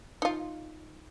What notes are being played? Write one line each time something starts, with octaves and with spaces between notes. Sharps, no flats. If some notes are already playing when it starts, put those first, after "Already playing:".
D#4 F4